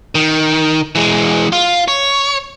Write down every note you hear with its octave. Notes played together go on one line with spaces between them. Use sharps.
D#3
E3 G#3
F4
C#5